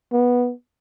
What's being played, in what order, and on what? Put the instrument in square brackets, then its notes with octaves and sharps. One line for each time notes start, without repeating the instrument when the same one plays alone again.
[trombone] B3